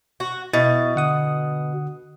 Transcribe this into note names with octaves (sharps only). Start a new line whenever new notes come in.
F#4
B2 E4 A6
D3 F#5 D#6